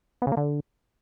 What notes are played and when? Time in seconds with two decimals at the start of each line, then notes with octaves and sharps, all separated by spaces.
0.22 B3
0.27 C#3
0.32 A#3
0.37 D3